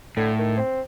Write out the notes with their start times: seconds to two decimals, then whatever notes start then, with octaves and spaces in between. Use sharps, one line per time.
0.17 A2 D3
0.39 D#3
0.57 C4